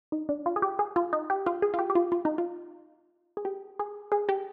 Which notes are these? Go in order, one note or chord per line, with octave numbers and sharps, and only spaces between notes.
D#4
D4
F4
G#4
G4
G#4
F4
D#4
G4
F4
G#4
F4
G4
G4
F4
F4
D#4
F4
G#4
G4
G#4
G#4
G4